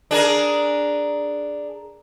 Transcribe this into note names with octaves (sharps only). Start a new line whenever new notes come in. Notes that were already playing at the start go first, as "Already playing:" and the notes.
D4 G#4 A#4